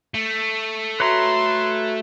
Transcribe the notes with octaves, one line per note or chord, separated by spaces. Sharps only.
A3
F#4 B4 C#5 E5 A#5 C6